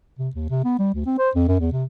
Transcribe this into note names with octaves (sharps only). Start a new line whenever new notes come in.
C3
D#2
C3
B3
G3
D2
C4
C5
F2
F#2
E2
C3